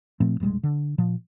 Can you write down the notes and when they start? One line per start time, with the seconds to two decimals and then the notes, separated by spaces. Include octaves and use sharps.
0.20 A#2 F3 A3 C4
0.40 E1 A#1 G3 G#3
0.63 D3
0.98 A#2 F3